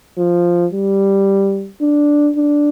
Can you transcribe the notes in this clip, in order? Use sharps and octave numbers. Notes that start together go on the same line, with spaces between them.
F3
G3
D4
D4